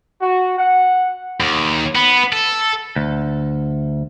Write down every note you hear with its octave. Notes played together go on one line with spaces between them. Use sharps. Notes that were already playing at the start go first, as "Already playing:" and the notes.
F#4
F#5
D#2
B3
A4
D2